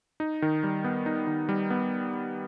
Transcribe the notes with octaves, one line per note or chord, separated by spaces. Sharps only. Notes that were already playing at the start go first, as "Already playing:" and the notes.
D#4
D#3
G3
B3
D#4
D#3
G3
B3